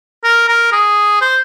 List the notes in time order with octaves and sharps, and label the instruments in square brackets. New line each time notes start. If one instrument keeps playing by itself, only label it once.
[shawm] A#4
A#4
G#4
C5